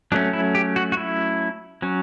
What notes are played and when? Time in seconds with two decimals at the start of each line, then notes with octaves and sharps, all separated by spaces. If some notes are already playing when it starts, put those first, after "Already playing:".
0.12 F#3 A3 C#4 D4
0.33 E4
0.55 G4
0.76 F#4
0.92 F#4
0.97 E4
1.82 F#3 C#4